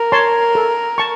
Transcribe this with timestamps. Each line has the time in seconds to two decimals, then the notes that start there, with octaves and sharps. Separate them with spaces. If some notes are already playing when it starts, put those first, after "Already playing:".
Already playing: A#4
0.12 C#5 A5 C6
0.55 A4
0.98 A5 C#6